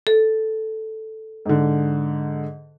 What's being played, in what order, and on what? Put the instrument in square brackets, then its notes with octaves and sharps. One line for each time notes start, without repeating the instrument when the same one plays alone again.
[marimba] A4
[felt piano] G#2 D3